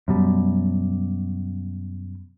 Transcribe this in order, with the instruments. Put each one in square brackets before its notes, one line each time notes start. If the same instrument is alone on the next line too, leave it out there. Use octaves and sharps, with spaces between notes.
[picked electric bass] F#2 B2 G3